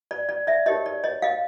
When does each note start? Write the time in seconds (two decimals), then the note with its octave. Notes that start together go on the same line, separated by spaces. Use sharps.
0.11 D5
0.29 D5
0.47 D5 E5
0.66 D#4 G4 A#4 C#5 D#5
0.86 D5
1.04 C#5 D#5
1.22 D#5 F5